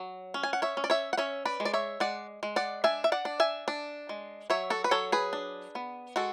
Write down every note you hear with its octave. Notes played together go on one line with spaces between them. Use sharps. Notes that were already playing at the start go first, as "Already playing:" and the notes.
Already playing: F#3
C#4
G#5
F#5
C#5 E5
C#4
D5
C#5 E5
F#5
C#4 C#5 E5
B4 D5
G#3
D5
C#5 E5
G#3 D5 F#5
G#3
D5 F#5
D4 E5 G#5
E5
D5 F#5
D4
E5 G#5
D4
G#3
F#3 C#5 E5
F#4 A4
B4
F#3 A4 C#5
G#4 B4
D4
B3
G#3 F#4 A4